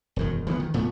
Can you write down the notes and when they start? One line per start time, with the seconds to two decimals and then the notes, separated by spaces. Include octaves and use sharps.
0.16 E1 F#2 D#3
0.47 E3 F3 G3 B3
0.60 D#3
0.74 D#1 A#2 A3 B3